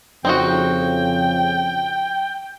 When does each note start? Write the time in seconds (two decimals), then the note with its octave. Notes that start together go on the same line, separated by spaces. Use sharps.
0.25 F2 C#3 C4 D#4 F#4 G5